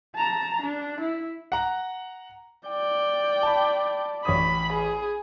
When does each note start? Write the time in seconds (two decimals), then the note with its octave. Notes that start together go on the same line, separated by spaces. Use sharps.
0.15 A5 A#5
0.61 D4
1.00 E4
1.52 F#5 A#5
2.68 D5 G5
3.43 A5 B5
4.25 A1 C#5 B5 D#6
4.73 G#4